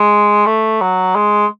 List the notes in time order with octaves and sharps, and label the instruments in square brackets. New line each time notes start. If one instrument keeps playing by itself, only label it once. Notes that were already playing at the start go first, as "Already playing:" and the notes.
Already playing: [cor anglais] G#3
A3
F#3
G#3